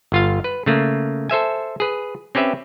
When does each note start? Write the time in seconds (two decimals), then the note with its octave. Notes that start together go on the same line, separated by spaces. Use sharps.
0.12 G1 F4 F5
0.44 B4
0.66 C#3 A3 A#3
1.30 A4 C5 E5 G#5
1.80 G#4 B4
2.35 C4 C#4 G4 B4 E5